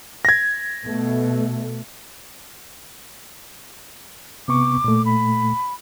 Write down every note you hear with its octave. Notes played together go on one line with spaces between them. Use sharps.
G#6 A#6
B2 A3
C3 B3 C#6 D6
A#2 A3
B5